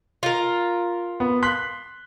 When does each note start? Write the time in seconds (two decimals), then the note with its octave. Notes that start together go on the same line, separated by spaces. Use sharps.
0.23 F4 A#4
1.20 B3
1.43 C6 F#6 B6